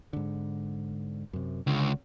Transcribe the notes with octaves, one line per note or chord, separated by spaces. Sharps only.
G#2 D3
F#2 C3
C#2 D3